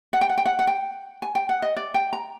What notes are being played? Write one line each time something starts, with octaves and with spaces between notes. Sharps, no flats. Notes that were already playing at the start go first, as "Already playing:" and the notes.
F#5
G5
F#5
G5
F#5
F#5
G5
G#5
G5
F#5
D#5
D5
G5
A#5